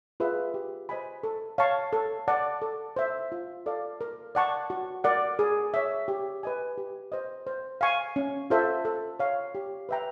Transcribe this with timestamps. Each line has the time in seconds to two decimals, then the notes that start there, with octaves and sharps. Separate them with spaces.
0.20 F4 G#4 B4 E5
0.54 G4
0.89 C5 D#5 G#5 B5
1.23 A4
1.58 C#5 F5 A5 C#6
1.93 A4
2.28 D5 F#5 A5
2.62 A4
2.96 C5 E5
3.32 F4
3.66 A4 D5 F5
4.01 A#4
4.35 D5 F#5 A5 C#6
4.70 F#4
5.04 A#4 D5 F#5
5.39 G#4
5.74 C#5 E5
6.08 G4
6.43 B4 D#5 G#5
6.78 G4
7.12 C5 D#5
7.47 C5
7.81 F5 G#5 C#6
8.16 C#4
8.50 F4 A4 C5 E5
8.85 A4
9.19 C#5 F5
9.55 G4
9.89 B4 E5 G5 A#5